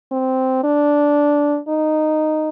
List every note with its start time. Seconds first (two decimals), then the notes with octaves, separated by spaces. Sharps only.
0.12 C4
0.64 D4
1.69 D#4